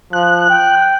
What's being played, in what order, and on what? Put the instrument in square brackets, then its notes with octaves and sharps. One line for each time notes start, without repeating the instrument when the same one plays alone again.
[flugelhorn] F3 [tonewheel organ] F#6
[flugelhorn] G5